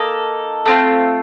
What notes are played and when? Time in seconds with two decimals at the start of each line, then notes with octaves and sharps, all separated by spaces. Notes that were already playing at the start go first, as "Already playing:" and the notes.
Already playing: A#3 D#4 A4
0.66 A3 C4 F4